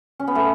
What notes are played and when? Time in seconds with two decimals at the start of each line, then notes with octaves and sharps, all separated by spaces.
0.19 C#4
0.27 B3
0.35 A3